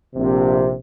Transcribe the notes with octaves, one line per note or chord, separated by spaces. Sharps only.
A#1 C3